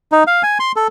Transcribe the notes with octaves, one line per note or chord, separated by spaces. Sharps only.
D#4
F5
G#5
C6
A4